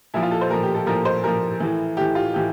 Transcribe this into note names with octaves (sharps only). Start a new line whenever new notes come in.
A#2 F3 E4
F4
A4
C5
A#2 F3 A#4
G4
A4
A#2 F3 A#4
C5
A#2 F3 A#4
A2 E3
A2 E3 G4
F4
A2 E3 G4